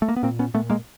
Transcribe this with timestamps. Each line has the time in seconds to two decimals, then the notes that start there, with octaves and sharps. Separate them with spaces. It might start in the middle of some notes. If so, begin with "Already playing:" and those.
0.02 A3
0.09 A#3
0.16 B3
0.23 A#2 A#3 C4
0.39 B3 C#4
0.54 A#2 A3 B3
0.70 G#3 A#3